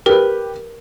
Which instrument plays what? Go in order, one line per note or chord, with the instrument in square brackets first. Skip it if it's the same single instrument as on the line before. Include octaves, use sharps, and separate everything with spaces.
[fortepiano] G4 B4 [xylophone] A#4